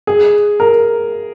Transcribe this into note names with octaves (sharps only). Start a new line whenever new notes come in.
G#4
A#4